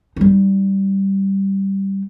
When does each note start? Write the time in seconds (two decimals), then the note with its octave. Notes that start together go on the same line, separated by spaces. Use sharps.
0.16 G3 D#4